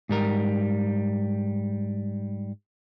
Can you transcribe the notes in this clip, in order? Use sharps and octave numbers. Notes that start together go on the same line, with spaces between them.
G#2 G3 A#4